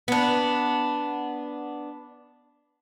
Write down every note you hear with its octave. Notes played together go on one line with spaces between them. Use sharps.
B3 D4